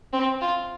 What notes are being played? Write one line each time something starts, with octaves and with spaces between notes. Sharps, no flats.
C4
F4